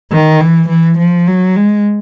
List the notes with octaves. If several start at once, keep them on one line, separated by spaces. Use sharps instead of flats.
D#3
E3
E3
F3
F#3
G#3